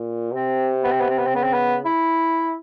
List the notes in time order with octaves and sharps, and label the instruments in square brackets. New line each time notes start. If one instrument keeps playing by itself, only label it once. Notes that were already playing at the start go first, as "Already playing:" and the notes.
Already playing: [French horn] A#2
[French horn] C3 [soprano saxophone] C4
[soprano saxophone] B3
C4
B3
C4
B3
C4
[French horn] C#3 [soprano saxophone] B3
[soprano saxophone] C4
B3
E4